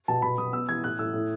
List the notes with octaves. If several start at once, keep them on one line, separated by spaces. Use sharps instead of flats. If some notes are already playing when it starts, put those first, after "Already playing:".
B2 A5
B2 B5
B2 D#6
B3 E6
E3 G#6
A2 F#6
A2 E6
A2